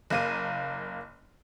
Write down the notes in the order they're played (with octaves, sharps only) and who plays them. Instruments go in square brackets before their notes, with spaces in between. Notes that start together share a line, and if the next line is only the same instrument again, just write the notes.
[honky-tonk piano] F#1 A#3 D#7